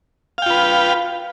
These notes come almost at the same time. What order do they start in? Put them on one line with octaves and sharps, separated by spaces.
F5 G5 F4 B4